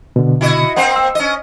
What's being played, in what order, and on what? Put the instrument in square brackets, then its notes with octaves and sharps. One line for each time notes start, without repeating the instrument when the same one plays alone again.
[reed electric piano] B2 D3
[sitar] E4 F#4 D#5
[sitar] A#3 C4 C5 [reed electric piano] F#5
[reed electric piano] E6
[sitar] C#4 D#5